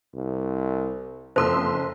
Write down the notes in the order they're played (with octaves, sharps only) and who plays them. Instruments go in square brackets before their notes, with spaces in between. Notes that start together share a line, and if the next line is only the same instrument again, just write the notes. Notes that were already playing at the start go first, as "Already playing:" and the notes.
[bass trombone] C2
[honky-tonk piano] F#1 C6 E6 [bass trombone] F2 [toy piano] A4 C5